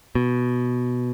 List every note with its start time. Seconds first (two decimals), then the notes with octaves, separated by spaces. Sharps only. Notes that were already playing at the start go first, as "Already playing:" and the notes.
0.15 B2